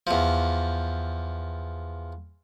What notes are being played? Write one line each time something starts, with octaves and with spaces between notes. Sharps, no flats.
E2 F3